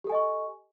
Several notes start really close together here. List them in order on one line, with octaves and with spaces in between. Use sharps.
G4 A4 G#5 D#5 C#6